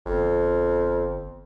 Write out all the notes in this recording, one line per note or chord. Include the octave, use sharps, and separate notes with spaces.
G1 F2